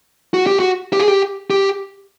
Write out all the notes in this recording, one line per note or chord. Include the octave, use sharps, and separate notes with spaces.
F#4
G4
F#4
G4
G#4
G4
G4